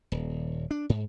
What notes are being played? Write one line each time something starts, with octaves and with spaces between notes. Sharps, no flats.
D#1
D4
G#2